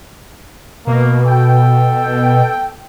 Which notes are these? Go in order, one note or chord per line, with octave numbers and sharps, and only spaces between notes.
B2 A#3
A4 G5